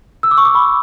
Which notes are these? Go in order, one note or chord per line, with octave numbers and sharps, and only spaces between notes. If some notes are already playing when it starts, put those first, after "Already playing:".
E6
D6
C#6
D6
B5